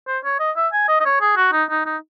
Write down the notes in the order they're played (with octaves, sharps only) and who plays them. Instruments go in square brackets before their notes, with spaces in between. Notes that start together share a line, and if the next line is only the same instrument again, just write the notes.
[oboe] C5
C#5
D#5
E5
G#5
D#5
D#5
C#5
G#4
F#4
D#4
D#4
D#4